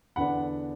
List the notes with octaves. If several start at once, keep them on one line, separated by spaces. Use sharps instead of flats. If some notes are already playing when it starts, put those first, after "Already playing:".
E2 D3 B3 D4 F#5 B5